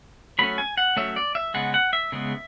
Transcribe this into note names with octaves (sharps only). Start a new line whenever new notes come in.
F#3 A3 C#4 B5
G#5
F#5
F#3 A3 C#4 E5
D5
E5
C#3 G#3 B3 F#5
F#5
E5
C#3 G#3 B3